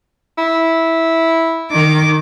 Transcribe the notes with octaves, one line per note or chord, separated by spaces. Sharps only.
E4
D#3 D6